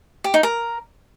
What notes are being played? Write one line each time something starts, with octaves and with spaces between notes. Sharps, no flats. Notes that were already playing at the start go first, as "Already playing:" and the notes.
G4
D#4
A#4